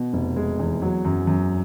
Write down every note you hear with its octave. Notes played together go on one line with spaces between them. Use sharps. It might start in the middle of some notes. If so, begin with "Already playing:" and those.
Already playing: B2
F1
G#3
E2
F#3
F#2
F#2